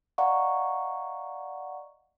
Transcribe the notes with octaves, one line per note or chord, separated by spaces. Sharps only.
D5 D#5 F5 F#5 A#5 C#6